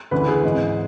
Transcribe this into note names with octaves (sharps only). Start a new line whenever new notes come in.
D2 C#3 E3 B4
G#4
G#1 G#2 E3